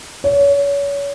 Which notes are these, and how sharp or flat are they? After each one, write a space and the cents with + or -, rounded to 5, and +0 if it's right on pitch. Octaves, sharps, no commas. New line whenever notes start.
C#5 +30